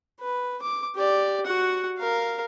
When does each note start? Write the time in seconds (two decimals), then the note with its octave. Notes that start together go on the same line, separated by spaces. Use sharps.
0.20 B4
0.62 D6
0.96 G4 D5
1.46 F#4 F#5
1.98 A#4 F5